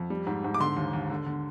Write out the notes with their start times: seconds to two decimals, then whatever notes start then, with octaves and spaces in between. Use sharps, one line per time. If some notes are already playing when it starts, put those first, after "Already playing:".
Already playing: F2
0.10 G3
0.27 G#2
0.44 G#2
0.54 D6
0.60 D3 C6
0.76 D#2
0.93 D#2
1.10 D3
1.26 D3